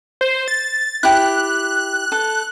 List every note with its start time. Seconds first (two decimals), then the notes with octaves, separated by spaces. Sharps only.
0.21 C5
0.48 A6
1.03 E4 G4 F#6
2.12 A4